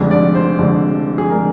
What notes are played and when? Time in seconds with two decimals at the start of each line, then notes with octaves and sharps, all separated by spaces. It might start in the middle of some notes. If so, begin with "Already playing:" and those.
Already playing: F1 F2 D3 G#3
0.11 D5
0.35 C5
0.59 F1 F2 D3 G#3
1.18 G#4
1.30 D3 G#3 A#4